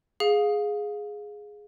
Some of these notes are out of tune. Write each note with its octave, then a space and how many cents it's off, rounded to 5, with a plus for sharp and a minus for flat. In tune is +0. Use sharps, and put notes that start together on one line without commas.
G#4 +0 F5 +20